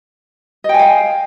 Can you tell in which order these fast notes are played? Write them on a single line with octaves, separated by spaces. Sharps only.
D#5 G5 G#5 F5